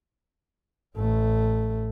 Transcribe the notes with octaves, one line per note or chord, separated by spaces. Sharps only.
A1 A3